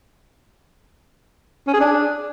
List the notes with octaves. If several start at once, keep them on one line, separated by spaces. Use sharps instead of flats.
C#4
G#4
D4